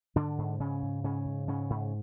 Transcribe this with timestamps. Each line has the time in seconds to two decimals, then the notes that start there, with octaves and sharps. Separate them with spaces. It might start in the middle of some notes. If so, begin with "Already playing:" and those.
0.16 G#2 D3 D4
0.38 G#2
0.60 G#2 C#3 C#4
0.82 G#2
1.04 G#2 C#3 C#4
1.26 G#2
1.47 G#2 C#3 C#4
1.70 G#2